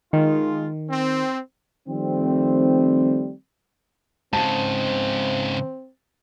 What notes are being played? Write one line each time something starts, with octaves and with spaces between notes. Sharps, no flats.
D#3 G#3 F4
C4
D#3 F3 G3 A3 C4
G#2 C#3 C4 A5